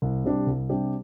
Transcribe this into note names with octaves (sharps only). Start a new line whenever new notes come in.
C2
C3 G3 D4 G4
C2
C3 G3 D4 G4